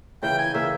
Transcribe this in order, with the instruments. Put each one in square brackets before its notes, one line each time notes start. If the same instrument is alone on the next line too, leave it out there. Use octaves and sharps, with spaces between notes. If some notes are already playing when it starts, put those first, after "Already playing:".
[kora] C#3 E3 A#3 [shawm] G5
[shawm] G#5
[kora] C#3 E3 A#3 [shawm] E5